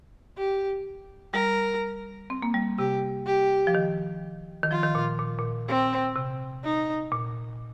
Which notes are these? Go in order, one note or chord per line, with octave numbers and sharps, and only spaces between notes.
G4
G3 A#4
C4
A#3
G3
C3 G4
G4
F3
D#3
D#3
F3 F4
D#3
A#2
A#2
A#2
C4
C3
D#4
A#2